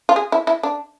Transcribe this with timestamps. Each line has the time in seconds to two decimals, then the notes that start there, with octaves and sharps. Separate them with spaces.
0.09 F4
0.16 G#4
0.32 E4
0.47 E4
0.63 D4